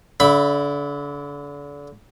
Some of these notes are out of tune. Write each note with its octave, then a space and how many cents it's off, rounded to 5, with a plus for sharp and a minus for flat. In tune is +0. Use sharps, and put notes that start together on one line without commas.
D3 -35 E5 +0 B5 +0